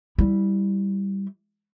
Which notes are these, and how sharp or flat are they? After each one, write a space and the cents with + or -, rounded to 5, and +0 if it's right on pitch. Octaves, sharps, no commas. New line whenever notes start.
G3 +0 E4 -15